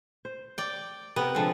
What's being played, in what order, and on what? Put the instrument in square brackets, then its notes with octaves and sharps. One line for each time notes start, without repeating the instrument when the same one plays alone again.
[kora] C5
[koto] D5 G5
[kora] C3 A4 A#4 [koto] B3
[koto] D3 F3 [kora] G#3 C4 F#5